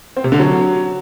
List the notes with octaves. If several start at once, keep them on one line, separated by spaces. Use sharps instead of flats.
C4
C3
D3
F#3